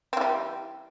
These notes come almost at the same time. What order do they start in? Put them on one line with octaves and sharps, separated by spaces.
C4 E3 G3